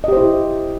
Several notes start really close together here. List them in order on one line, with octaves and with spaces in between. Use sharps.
D#5 G4 C5 E4